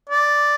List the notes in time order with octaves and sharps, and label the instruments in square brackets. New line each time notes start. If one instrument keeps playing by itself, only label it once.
[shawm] D5